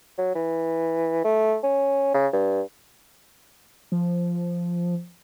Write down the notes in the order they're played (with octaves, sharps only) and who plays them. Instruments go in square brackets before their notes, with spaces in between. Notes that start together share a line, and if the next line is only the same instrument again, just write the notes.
[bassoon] F#3
E3
A3
C#4
C#3
G2
[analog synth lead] F3